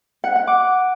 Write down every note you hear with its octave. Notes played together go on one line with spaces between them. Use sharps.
F#5
F#5
D6